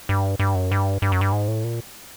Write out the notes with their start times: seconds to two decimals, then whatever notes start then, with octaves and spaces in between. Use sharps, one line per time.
0.09 G2
0.39 G2
0.55 F#2
0.71 G2
1.02 G2
1.12 F#2
1.21 G2
1.32 G#2
1.48 A2
1.64 A#2